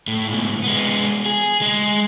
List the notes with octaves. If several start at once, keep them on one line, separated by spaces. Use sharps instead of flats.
A2
G#2 B2
G#3 B3
G#4
G#3